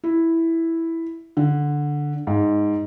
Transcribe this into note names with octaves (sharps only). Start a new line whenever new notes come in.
E4
D3
G#2